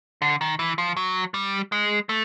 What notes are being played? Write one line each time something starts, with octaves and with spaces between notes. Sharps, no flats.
D3
D#3
E3
F3
F#3
G3
G#3
A3